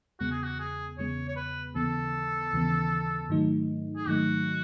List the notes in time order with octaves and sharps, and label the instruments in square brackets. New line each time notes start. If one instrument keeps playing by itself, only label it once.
[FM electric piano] E2 C#3 G#3 B3 [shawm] F#4
[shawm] G#4
F#4
G#4
[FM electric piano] E2 C#3 G#3 B3 [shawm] C#5
[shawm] C#5
B4
[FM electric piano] D#2 C#3 E3 B3 [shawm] A4
[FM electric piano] D#2 C#3 E3 B3
G#2 D#3 F#3 A3 D#4
[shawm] G#4
[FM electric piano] G#2 D#3 F#3 A3 D#4 [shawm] F#4